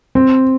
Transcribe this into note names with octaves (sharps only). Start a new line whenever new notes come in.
C4